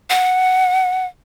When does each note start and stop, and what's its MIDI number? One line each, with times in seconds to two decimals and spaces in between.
0.10 1.06 78